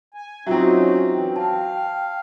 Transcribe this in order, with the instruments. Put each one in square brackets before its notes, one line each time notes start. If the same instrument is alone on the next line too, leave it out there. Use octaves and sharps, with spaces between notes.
[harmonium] G#5
[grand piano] F#3 C4 [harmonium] C#4 D#4 [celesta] F4 E5
[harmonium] E3 C#4 [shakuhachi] G5
[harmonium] F5 [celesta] A5